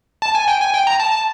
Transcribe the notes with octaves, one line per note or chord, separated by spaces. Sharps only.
A5
G#5
G5
G#5
G5
A#5
A5
A5